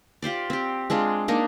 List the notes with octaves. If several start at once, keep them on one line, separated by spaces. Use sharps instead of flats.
F4 G4 C5 D5
C4 G4
G#3 C4 D4 F4
A#3 D4 D#4